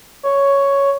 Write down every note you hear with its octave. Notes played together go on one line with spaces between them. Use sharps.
C#5